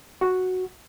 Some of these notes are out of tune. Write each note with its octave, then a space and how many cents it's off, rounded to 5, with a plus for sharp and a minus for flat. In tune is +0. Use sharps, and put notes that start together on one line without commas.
F#4 -5